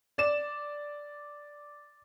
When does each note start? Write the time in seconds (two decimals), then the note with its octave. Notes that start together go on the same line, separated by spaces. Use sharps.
0.18 D5 E7